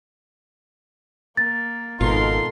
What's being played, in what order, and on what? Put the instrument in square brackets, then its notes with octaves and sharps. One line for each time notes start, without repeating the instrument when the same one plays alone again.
[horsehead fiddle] A#3 [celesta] A6
[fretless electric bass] G#1 B2 [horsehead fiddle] D#4 A#4 [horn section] F4 A4 C6